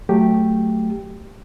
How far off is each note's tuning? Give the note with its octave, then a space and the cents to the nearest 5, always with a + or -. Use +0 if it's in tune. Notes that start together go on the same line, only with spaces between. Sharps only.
F#3 +0 A3 +0 G4 +0